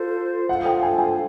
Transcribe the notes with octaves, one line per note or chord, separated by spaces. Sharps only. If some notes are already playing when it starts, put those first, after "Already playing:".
Already playing: F4 A4 C5
F4 A4 C5 F5 F#5
G5
G#5
G#5